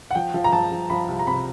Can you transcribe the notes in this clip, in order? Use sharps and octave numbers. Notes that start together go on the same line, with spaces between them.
F#5
F3 G5
F3
A#5
F3 A5
F3
F3 B5
C2
A#5
C3 B5